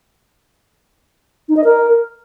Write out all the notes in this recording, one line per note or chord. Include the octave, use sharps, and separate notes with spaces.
D#4
D#5
A#4